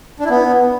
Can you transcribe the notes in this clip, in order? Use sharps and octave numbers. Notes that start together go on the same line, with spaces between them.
D4
E4
B3